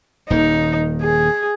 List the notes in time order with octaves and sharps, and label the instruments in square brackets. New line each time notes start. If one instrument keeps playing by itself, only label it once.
[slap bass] D#1 D#3 A#3 [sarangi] D#4
[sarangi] G#4